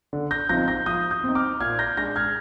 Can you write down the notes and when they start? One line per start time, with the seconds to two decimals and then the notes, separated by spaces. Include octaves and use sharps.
0.13 D3
0.31 G6 A#6
0.49 F3 C4 D#4 G6 A#6
0.68 G6 A#6
0.86 F3 D#6 G6
1.11 D#6 G6
1.23 C4 D#4
1.35 D6 F6
1.60 A#2 F6 G#6
1.79 G6 A#6
1.97 G#3 D4 G6 A#6
2.16 F6 G#6